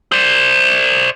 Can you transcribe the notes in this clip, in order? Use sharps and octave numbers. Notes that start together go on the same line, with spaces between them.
C5 D5